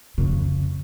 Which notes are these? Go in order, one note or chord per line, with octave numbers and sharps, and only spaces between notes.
F2 C#3